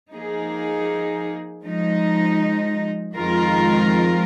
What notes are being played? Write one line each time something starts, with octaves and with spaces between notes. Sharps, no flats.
F3 A#3 D#4 G#4
F3 G#3 D#4
F2 D#3 G#3 F4 A#4